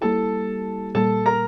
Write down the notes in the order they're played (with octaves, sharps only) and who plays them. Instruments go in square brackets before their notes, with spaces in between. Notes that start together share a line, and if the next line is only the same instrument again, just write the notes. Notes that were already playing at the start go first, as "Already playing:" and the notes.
[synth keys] G3 A#3 E4 G4 [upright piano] A4 A5
[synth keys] A#2 G3 A#3 [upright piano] A4 A5
[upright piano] A#4 A#5